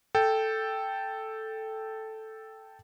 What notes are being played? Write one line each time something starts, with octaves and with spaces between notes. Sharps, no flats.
A4 G5